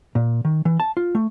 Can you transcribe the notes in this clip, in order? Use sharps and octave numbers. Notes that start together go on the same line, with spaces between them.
A#2
D#3
E3
A5
F4
A3